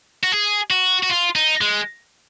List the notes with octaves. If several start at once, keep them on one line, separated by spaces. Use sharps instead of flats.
F#4
G#4
F#4
F#4
F4
D#4
G#3